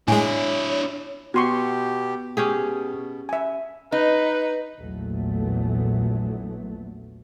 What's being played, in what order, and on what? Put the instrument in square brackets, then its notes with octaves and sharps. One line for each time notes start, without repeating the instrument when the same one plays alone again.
[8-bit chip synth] A2 G#3 [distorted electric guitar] D4 E4 [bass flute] C#5 [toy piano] G#5
[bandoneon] B2 G4 [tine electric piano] B3 [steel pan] F#4 C6 C#6
[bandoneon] B2 [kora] C#4 G4 G#4
[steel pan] E5 G#5
[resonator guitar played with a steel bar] D#4 [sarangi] B4
[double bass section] A#1 E2 A#2 F#3 A3